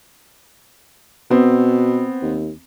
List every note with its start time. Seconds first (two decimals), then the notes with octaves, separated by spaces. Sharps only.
1.31 B2 B3 C4
2.22 D#2